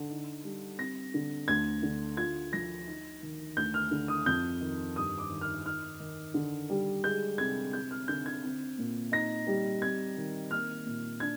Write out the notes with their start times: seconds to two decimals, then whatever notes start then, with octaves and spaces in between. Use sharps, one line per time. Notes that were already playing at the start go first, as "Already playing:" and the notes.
Already playing: D3
0.10 D#4
0.44 G3
0.78 C4 A#6
1.14 D3
1.48 D2 G#6
1.83 D3
2.17 F4 G#6
2.53 F3 A#6
2.87 D#4
3.22 D#3
3.57 D2 G6
3.74 F6
3.91 D3
4.08 D#6
4.26 F2 G6
4.60 D#3
4.96 G2 D#6
5.18 D6
5.30 D#3
5.41 F6
5.65 D#4 F6
6.00 D#3
6.34 D3
6.70 G3
7.04 G#3 G6
7.38 C3 G#6
7.73 C4 G6
7.91 F6
8.08 D3 G6
8.26 G#6
8.44 C4
8.78 A#2
9.12 D#4 A#6
9.47 G3
9.82 C4 G#6
10.17 D#3
10.51 A#3 F6
10.86 A#2
11.20 D4 G#6